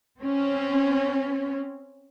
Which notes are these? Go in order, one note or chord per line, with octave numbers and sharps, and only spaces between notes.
C4 C#4